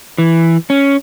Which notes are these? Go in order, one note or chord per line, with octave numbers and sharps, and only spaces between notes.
E3
C#4